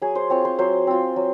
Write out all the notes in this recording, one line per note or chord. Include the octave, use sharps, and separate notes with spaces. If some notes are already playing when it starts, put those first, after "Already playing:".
F#3 G#4 G#5
C5 C6
C4 F4 C#5 C#6
C5 C6
F#3 C5 C6
C4 F4
F#3